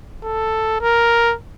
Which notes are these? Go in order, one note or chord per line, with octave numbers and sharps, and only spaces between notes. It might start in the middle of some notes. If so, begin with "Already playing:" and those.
A4
A#4